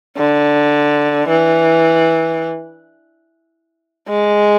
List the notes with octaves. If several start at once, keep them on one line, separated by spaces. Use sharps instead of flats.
D3
E3
G#3